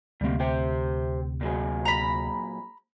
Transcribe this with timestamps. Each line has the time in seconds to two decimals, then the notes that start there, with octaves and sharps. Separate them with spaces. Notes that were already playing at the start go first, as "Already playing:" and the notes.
0.21 D2 C3 G3 A#3
0.40 G4 C5 G5
1.41 A#2 F#3 G#4
1.85 A#5 B5